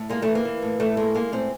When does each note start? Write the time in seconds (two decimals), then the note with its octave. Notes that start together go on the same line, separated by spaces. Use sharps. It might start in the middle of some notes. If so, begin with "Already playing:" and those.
Already playing: A2
0.10 G#3 A#3
0.22 E3 A3
0.35 A#3
0.45 E3
0.62 A2
0.80 A2 A3
0.97 G#3 A#3
1.15 G#3 A#3
1.32 A2 C4